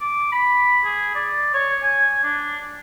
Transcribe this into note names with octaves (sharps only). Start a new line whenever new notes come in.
D6
B5
G#4
D5
C#5
G#5
D4